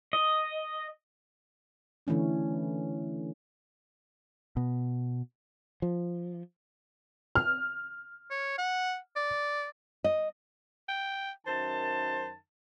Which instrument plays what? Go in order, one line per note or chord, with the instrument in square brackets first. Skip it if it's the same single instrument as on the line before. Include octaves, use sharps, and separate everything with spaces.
[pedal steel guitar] D#5
[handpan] D3 E3 A3 C#4 D4
[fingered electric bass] B2
[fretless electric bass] F3
[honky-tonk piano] F6
[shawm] C#5
F#5
D5
[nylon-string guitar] D#5
[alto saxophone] G5
[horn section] F#2 D#3 A5 [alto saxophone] C5